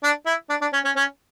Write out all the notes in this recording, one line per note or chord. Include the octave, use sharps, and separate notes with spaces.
D4
E4
D4
D4
C#4
C#4
C#4